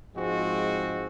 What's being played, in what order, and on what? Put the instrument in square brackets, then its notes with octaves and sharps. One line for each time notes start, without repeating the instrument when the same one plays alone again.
[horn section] G#2 F3 G#3 C4 F#4